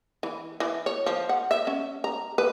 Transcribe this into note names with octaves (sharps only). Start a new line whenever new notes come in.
E3
E3
C#5
F3
F#5
E5
C#4
A#5
B4